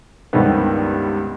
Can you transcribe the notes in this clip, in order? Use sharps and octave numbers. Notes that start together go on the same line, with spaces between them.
C#2 G2 C3 D#3 B3